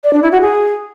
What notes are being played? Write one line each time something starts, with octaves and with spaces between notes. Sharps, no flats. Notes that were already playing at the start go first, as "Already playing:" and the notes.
D5
D4
E4
F#4
G#4